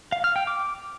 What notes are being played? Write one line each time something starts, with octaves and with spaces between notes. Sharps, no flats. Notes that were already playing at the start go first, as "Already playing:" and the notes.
F5
F6
G5
D6